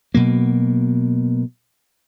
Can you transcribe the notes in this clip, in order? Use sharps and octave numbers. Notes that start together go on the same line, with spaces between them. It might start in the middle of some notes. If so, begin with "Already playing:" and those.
B2 F#3 A#3